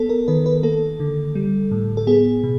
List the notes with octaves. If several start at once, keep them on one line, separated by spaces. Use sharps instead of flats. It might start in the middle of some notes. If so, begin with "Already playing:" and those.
Already playing: B3 A4
A#4
D#3 B4
B4
A#3 A4
D3
G3
A2
A4
B3 G#4
B2